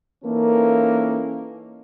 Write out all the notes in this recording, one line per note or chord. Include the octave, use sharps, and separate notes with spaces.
E3 A#3 C#4 D#4 A4 A#4